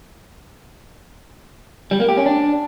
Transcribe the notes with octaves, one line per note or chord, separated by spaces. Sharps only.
G3
A#3
G4
C#4
D4